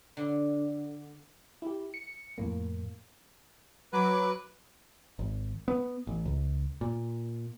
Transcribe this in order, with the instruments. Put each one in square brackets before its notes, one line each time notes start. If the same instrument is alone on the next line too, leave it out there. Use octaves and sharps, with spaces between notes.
[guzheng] D3
[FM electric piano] E4 G4
C#7
F2 A2 A#3
[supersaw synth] F#3 D6 [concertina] B4
[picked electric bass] G#1
B3
A1
C#2
A#2